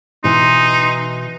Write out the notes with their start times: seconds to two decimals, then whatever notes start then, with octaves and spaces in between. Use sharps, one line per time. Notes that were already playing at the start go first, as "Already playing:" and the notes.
0.24 B2 E3 D#4 C6